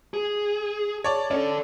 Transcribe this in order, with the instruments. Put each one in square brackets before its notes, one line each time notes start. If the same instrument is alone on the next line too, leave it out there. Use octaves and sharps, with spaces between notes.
[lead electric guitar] G#4
[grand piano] C#5 D5 A5
[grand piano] C#4 [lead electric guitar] A4 D5